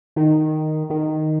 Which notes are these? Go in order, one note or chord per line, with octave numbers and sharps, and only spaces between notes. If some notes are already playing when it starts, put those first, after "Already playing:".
D#3
D#3